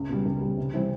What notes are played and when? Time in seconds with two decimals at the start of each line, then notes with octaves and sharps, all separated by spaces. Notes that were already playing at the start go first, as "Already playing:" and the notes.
Already playing: C#2
0.09 B2 G3
0.25 C#2
0.41 B2 G3
0.57 C3
0.74 E3 G3 C4